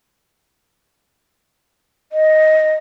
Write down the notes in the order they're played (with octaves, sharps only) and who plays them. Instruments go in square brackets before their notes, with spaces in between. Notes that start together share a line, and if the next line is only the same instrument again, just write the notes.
[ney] D#5